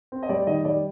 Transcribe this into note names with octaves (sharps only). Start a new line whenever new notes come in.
C4
D#5
G3 D5
D#3 D#5
G3 D5